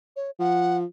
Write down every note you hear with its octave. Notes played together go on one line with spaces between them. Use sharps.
C#5
F3 F#5